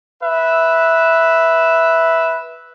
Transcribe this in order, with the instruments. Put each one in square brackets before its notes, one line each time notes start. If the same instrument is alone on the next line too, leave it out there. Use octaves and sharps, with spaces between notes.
[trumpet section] B4 E5